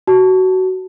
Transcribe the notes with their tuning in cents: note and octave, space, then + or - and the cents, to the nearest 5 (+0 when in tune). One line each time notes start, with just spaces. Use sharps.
F#4 +15 A5 +0